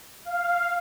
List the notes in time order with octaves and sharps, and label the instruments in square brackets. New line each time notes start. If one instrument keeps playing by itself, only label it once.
[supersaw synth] F5